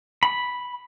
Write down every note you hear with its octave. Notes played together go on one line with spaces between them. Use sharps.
B5